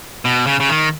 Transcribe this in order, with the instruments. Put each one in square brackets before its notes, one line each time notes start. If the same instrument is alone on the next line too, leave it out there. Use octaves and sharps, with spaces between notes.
[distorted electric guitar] B2
C#3
C#3
D#3